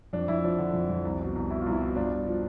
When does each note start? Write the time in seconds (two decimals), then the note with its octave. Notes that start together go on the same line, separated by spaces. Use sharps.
0.13 F2 D4
0.28 F2 E4
0.44 F3 D4
0.58 D3
0.74 F2
0.89 F2
1.05 C2
1.20 B2
1.35 C2
1.50 B2 E4
1.61 C2 F4
1.72 E4
1.80 B2
1.96 G2 D4 F4
2.12 G2
2.27 F3